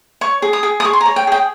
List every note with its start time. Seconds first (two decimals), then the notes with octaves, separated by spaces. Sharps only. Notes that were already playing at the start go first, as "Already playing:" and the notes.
0.21 C#5 C#6
0.42 G#4
0.53 D#6
0.63 G#4
0.80 D#6
0.85 G#4 C#6
0.93 C6
1.01 A#5
1.06 C#5
1.16 G5
1.27 G#4 G5